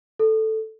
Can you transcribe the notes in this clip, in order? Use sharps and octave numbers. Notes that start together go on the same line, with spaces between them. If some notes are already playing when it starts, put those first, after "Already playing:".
A4